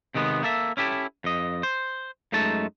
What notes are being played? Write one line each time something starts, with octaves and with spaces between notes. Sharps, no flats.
C3 D#3 G#3 B3
A#3 A4 E5
C#4 E4 G4 A4
F2 D#5
C5
F#2 G#3 A3 D#4 A5